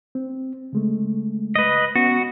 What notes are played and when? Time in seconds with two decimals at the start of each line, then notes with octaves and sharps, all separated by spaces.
0.15 C4
0.73 C#3 G#3 A3
1.56 B4 D#5
1.96 B3 C#4 F#4